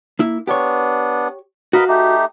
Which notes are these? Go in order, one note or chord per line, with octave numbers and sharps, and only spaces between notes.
A#3 E4
B3 D4 G4 C#5
F#4 A#4 B4 D#5 F5
A3 D#4 G4